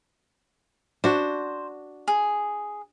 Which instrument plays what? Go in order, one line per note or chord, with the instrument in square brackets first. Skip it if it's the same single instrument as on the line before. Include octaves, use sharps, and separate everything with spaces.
[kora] D4 F#4 [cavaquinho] C5
[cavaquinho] G#4